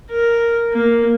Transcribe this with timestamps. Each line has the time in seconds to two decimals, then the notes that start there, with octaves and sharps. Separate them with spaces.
0.11 A#4
0.73 A#3